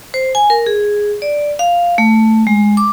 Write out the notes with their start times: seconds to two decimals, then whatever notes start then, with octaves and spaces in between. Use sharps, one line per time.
0.14 C5
0.35 G#5
0.50 A#4
0.66 G#4
1.22 D5
1.59 F5
1.98 A3
2.47 G#3
2.77 D6